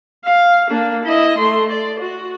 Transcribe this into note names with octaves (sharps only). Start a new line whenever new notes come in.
F5
A#3 D4
E4 D#5
A3 C6
D5
F#4